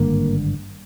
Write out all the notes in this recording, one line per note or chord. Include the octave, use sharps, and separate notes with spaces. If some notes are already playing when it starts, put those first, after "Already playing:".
Already playing: G#1 G2 D3 A#3